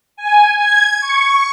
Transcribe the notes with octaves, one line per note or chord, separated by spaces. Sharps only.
G#5
G#6
C#6